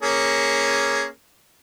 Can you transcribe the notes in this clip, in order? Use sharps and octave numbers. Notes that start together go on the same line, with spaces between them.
A#3 C#4 G#4